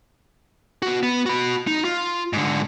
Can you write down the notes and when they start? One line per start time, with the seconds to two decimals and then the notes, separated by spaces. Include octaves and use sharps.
0.82 B3 F#4
1.03 B3
1.26 F#4 B5
1.67 D#4
1.85 F4
2.33 G#2 D3